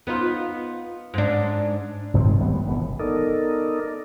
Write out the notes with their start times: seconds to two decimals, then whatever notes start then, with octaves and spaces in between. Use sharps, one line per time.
0.07 B3 D#4 F4
1.14 G#2 D4
2.14 F1 G2 D#3 C4
2.40 G#1 G3 B3
2.67 E1 E3 B3
2.99 B3 D#4 A4 A#4 D5 D#5